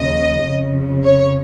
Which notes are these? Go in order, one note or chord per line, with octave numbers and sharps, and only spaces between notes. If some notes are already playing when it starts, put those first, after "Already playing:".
Already playing: D#2 C#3 F3 D#5
F2 C#3 F3
C#5